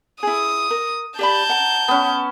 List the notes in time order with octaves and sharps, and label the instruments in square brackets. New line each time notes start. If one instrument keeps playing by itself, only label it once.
[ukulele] E4 G#4 [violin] D#6
[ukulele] A#4
[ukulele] G4 D5 B5 [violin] A5 G6
[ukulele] F#5 A#5
[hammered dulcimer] B3 C#4